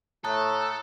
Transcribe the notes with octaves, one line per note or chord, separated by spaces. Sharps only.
A2 A3 A4 A#5 D#6 F#6